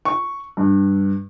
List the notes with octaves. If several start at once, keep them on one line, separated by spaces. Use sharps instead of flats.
C#6
G2